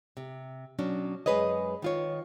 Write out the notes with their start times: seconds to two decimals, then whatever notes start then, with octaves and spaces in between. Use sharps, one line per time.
0.17 C3
0.79 B2 F#3 C#4 D4
1.26 F#2 G#3 G#4 B4 C#5 D#5
1.82 D#3 F4 C#5